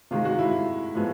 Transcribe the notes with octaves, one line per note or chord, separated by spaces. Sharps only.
C3 D#3 G#3 F4
F#4
F4
E4
A2 F3 G#3 B3